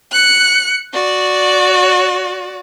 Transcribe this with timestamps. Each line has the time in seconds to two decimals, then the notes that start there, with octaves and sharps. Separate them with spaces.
0.11 F#6 C#7
0.93 F#4 D5